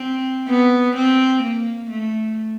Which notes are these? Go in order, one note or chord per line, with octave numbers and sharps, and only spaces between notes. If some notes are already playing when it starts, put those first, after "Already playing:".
Already playing: C4
B3
C4
A#3
A3